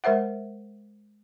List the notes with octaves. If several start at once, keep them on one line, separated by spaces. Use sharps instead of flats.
G#3 A#4 C5 E5 F#5